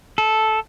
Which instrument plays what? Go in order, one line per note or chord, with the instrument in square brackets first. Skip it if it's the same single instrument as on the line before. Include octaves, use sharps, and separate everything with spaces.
[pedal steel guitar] A4